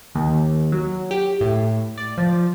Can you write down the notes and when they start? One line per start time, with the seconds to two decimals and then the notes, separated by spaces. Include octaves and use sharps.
0.15 D#2
0.72 F#3
1.11 G4
1.41 A2
1.97 D5
2.18 F3